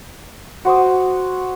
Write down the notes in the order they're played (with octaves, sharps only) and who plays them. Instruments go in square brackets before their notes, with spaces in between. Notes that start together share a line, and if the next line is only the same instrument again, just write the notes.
[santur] F#4 C5 D6 D#6